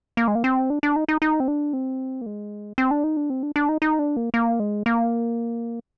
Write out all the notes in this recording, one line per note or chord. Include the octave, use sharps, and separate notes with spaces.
A#3
G#3
A#3
C4
D4
D4
D#4
D#4
D#4
C4
D4
C4
A#3
G#3
C4
D4
D#4
D4
C4
D4
D4
D#4
D#4
D4
A#3
A#3
G#3
A#3